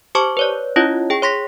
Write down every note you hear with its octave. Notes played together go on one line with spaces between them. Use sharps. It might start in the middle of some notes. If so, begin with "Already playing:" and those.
G4 C5 A5 C#6 D6
B4 C#5 D5
C#4 E4 F4 C#5 D#5
G#4 G5
C#5 C6 A#6 B6